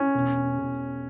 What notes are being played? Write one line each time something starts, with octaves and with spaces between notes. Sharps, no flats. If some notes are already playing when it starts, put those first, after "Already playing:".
Already playing: C#4
E1
E1